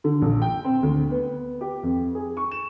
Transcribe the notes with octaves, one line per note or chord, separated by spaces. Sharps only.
D3
A#1
G5
C4
D2
B3
G4
F2
G#4
C#6
E7